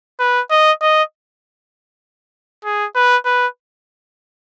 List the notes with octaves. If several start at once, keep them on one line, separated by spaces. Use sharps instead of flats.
B4
D#5
D#5
G#4
B4
B4